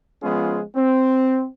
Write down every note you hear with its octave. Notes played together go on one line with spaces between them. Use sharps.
F3 G#3 B3 C#4 F4 G#4
C4